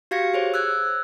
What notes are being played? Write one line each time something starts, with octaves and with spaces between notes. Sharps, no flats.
F#4 G4 F5 G#6 A#6 C#7
G#4 C5 C#5
E6 F#6 G#6